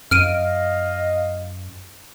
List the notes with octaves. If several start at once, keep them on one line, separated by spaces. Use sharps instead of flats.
F#2 D#5 F5 F6 D7 D#7